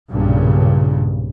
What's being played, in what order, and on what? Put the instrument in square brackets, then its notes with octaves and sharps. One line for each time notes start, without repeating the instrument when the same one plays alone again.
[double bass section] B1 G2 A#2 C#3